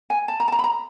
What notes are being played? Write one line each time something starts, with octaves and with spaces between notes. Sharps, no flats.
G#5
A5
A#5
A5
A#5
B5
A#5